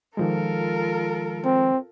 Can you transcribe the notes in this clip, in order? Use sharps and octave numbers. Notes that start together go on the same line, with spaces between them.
D#3 F3 G#3 F4 A4 A#4
C4